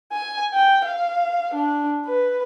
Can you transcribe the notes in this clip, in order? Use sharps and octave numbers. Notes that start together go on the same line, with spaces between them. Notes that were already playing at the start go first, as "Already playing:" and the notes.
G#5
G5
F5
D4
B4